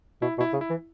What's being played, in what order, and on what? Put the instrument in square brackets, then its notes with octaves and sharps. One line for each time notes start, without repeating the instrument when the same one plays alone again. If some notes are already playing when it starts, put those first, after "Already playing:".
[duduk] B2 [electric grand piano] E4
[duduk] B2
[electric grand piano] E4
[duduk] C#3
[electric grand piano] E4
[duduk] E3